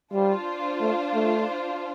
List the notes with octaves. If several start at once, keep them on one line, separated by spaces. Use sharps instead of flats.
G3 D4 F4 C5
A3
A3